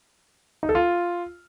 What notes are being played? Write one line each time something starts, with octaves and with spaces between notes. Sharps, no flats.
D#4
A4
F4